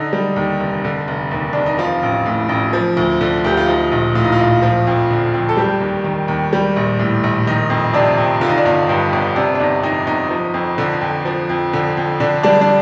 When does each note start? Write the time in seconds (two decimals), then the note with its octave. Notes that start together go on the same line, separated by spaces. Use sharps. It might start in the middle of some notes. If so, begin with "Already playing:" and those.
Already playing: D3 D#4
0.13 G3
0.36 D#2
0.60 F1
0.85 D3
1.08 F1
1.31 D#2
1.53 F1 D4
1.66 D#4
1.78 F3 F4
2.03 A1
2.26 A2
2.49 A1
2.73 F3
2.97 D2
3.21 D3
3.45 D2 G4
3.57 F4
3.68 F3 D#4
3.92 A#1
4.15 A2 F4
4.24 D#4
4.32 F4
4.39 A#1
4.62 F3
4.87 F2
5.10 D3
5.34 F2
5.49 A4
5.57 G3 G4
5.80 D#2
6.04 D#3
6.28 D#2
6.53 G3
6.76 A#1
6.99 A2
7.23 A#1
7.47 D#3 D#4
7.70 F2
7.94 C3 D4
8.18 F2
8.41 D3 F4
8.49 D#4
8.58 D4
8.66 G1 D#4
8.89 G2
9.13 G1
9.36 C3 D4
9.55 D4
9.60 G1 D#4
9.83 F2 D#4
10.07 G1 D#4
10.30 F3
10.54 F2
10.78 D3
11.01 F2
11.25 F3
11.49 F2
11.73 D3
11.97 F2
12.20 D3 D4
12.43 G3 D4
12.61 D4